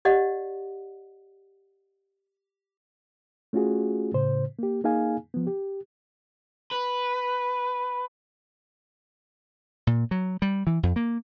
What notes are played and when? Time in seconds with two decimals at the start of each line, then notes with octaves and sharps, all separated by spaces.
0.05 G4 D5 D#5 F#5
3.53 A3 C#4 F4 F#4 G#4
4.13 A2 C#3 C5
4.59 A#3 G4
4.84 A#3 D#4 G#4 F5 G#5
5.34 F3 B3
5.47 G4
6.71 B4
9.87 A#2
10.11 F#3
10.42 G3
10.67 E3
10.83 F2
10.96 A#3